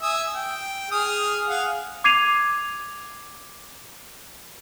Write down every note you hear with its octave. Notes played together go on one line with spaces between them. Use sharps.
E5 G#5 D#6
G5
G#4 D#6 F6
G#4 F5 F#5
D6 G#6 C7 D#7 F7